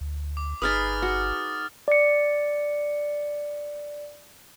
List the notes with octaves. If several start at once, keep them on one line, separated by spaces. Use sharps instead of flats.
D2
D6
G1 D#4 G#4 B4 D#6 F6 A6
F#4
D5 C#7